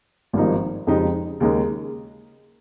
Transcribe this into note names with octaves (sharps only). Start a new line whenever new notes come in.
G#1 G2 F3 A#3 D#4
F2 C#3 G#3 D#4 G4
D#2 C#3 G#3 D#4 A#4